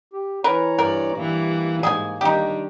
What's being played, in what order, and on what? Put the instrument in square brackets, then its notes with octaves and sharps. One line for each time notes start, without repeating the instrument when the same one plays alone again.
[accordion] G4
[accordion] E3 C#5 A#5 [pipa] A#4 B4
[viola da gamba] G2 D5 [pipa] A#4
[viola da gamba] E3 G3 [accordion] A#3
[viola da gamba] G#2 [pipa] G#4 E5 G#5
[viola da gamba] D#3 G3 D4 [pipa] D#4 G4